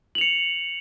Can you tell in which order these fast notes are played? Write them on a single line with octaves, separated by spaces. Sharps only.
F#7 F7 C#7